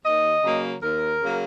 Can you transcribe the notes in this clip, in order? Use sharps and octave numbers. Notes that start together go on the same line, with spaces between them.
D#2 D#5
C#3 F#3 A#3
D#2 A#4
C#3 F#3 A#3